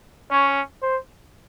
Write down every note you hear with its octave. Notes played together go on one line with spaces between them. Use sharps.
C#4 C#5
C5